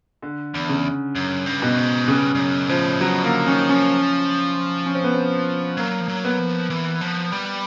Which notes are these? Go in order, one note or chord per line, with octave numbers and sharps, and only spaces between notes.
D3
E2
C#3
F#2
G2
B2
G#2
G2 C#3
G2
F#2
A2 F3
B2 F#3
D3 A#3
D#3 C#4
F3 C#4
C#4
C4
B3
C4
F#3 A#3
F3
F#3
B3
F3
E3
F3
G3